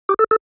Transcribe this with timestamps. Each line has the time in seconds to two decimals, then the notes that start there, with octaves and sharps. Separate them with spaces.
0.09 G4
0.19 A4
0.31 A4